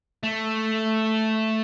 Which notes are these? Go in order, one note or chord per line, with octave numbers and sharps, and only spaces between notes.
A3